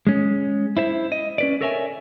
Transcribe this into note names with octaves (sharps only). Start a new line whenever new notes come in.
G#3 C#4
E4 C5 E5
D#5
C#4 B4 D5
A4 A#4 C#5 E5 F#5 G#5